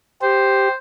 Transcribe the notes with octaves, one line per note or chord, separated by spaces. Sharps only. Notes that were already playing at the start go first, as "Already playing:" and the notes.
G4 C5